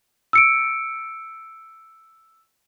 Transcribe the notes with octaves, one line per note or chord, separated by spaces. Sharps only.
E6 C#7 D7